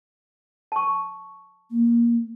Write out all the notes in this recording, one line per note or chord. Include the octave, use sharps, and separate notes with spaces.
A5 C#6
A#3